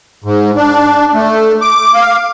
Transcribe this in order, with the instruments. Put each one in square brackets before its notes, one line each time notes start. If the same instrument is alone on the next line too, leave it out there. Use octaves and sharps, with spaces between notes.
[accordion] G#2
D4
A3
D6
F5